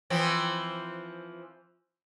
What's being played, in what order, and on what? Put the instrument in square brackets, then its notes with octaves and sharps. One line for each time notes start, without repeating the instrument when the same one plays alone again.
[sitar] E3 F3 C4